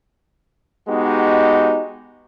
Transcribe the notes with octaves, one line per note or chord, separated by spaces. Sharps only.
G#3 B3 D#4 F#4 G4